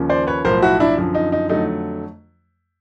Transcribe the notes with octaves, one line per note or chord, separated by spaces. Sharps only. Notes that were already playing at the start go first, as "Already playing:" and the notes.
Already playing: D#2 C#3 F3 A#3 C#4
C5 D5
B4 C#5
B1 A2 F3 A#4 C5
E4 F#4
D4 E4
F#2 D3 F3
D#4
D#4
F2 D3 F#3 A3 D#4